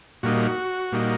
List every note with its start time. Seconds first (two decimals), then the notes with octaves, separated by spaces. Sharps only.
0.23 A#2 G3 A#3 D#4 F#4
0.92 A#2 G3 A#3 D#4